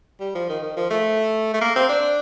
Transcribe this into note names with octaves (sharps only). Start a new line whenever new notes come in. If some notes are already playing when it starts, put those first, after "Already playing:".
G3
F3
D#3
D#3
F3
A3
A3
A#3
C4
D4